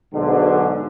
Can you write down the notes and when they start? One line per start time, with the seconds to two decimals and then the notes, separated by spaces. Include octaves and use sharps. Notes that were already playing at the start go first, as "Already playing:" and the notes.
0.13 B1 G#2 D3